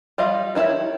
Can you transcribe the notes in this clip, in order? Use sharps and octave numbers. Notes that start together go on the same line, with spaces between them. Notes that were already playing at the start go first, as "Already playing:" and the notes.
G3 F4 D#5 F5
D#3 D#4 E4 G4 C#5